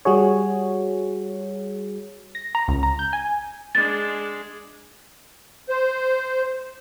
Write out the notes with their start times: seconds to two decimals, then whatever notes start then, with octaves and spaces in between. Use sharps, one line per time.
0.05 G3 F#4 G#4 C#5
2.35 A#6
2.55 A#5
2.68 C#2
2.83 A#5
2.99 G6
3.13 G#5
3.75 G#3 D4 A6
5.69 C5